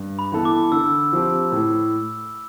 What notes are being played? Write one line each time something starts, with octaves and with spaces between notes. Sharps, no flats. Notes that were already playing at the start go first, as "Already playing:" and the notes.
Already playing: G2
B5
E3 B3 E4 A4
D6
D3 E6
F3 C4 G4
A2